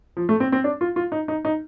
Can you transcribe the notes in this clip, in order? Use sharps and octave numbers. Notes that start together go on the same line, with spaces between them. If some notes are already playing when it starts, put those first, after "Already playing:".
F3
A3
C4
C4
D4
F4
F4
D#4
D#4
D#4